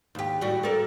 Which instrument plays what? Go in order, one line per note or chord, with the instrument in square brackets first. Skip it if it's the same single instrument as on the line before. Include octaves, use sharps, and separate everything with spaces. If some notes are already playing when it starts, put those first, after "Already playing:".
[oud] D#2 G4
A2 G3 F#4
A4 A#4 D5